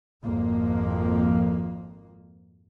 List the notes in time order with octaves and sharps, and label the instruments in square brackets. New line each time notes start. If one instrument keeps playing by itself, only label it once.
[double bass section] G#1 F2 A#3